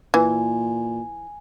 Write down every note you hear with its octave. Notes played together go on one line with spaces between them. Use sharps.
A#2 E3 G#5